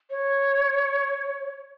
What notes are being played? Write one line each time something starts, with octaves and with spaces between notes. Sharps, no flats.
C#5